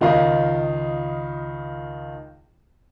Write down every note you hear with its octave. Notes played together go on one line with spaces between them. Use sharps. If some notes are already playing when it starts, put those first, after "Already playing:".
C#2 D#3 F4 D#5 F5